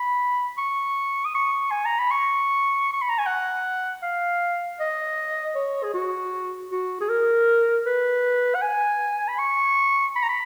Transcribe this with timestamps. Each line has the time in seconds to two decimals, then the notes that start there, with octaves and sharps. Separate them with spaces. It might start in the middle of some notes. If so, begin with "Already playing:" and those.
Already playing: B5
0.58 C#6
1.25 D#6
1.35 C#6
1.71 G#5
1.85 A#5
1.99 B5
2.11 C#6
2.93 C#6
3.02 B5
3.09 A#5
3.18 G#5
3.26 F#5
4.03 F5
4.80 D#5
5.55 C#5
5.83 G#4
5.94 F#4
6.71 F#4
7.01 G#4
7.09 A#4
7.86 B4
8.55 F#5
8.62 G#5
9.28 B5
9.39 C#6
10.16 B5
10.23 A#5
10.29 B5